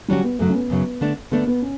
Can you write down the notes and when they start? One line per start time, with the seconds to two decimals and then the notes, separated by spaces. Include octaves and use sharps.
0.08 D3 F#3 G3 C#4 F#4
0.24 B3
0.39 F#2 C#3 F#3 A3
0.50 C#4
0.55 B3
0.70 F#2 C#3 F#3
1.01 D3 A3 D4
1.31 D3 A3 B3 D4
1.47 B3
1.62 C#4